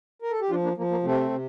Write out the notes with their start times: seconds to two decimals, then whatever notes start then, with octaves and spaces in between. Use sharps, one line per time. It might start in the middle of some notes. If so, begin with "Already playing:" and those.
0.22 A#4
0.31 A4
0.41 G4
0.49 F3 D4 F4
0.63 A#3 D4
0.77 F3 A#3
0.91 A#3
1.03 C3 A3 C4
1.30 C3